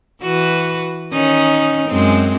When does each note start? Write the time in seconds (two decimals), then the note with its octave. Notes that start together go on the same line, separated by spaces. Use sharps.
0.22 E3 F#4 B4
1.13 D#3 C#4 D#4
1.88 F#2 G#3 C4